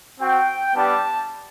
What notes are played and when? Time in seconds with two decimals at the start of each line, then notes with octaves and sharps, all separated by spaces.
0.19 C4 F#4 G5
0.74 G3 B3 D4 G4 A5